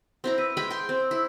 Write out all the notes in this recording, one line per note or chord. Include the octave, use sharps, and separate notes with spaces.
C4 E4 A#5
B4
G#3 G5 B5
G5 C6
C4
E4